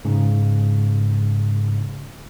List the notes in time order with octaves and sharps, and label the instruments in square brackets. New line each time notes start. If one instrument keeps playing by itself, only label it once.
[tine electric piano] G#2 C#3